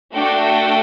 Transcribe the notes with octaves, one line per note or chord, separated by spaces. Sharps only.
A3 D4 F#4 A4 G5